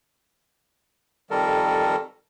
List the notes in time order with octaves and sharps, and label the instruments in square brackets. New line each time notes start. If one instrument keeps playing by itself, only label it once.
[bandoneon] F2 D#3 G3 A4 A#4